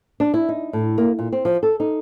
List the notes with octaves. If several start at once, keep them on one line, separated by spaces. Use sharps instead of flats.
D4
E4
D#4
A2
A#3
A#2
C4
F3
A4
D#4